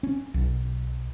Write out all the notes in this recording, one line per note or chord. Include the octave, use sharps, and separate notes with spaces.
C#4
B1